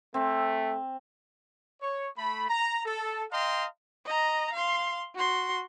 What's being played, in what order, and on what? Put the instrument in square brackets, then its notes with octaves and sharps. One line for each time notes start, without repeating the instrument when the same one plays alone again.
[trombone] A3 [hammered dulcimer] C4
[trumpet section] C#5
A3 B5
A#5
A4
D#5 F5 G5 A#5 C6
[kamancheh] D#5 A#5
F5 C6
F#4 C6